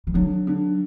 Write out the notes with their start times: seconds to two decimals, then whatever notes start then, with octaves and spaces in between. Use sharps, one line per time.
0.07 E3
0.14 D3 F#3
0.47 D3